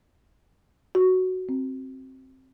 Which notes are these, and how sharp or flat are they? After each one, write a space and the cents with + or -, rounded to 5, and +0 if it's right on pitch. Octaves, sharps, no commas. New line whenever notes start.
F#4 +5
C4 +10